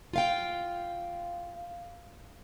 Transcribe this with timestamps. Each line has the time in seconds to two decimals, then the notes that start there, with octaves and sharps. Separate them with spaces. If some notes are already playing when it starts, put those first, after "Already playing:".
0.13 F4 F5 G5